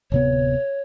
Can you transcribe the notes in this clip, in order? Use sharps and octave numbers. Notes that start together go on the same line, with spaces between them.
D1 C3 B3 C#5